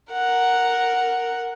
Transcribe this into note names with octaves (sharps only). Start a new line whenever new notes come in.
A#4 F#5